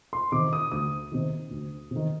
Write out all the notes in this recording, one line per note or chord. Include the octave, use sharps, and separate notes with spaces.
C6
C3 D#3 D6
D#6
D2 D#6
C3 D#3
D2
C3 D#3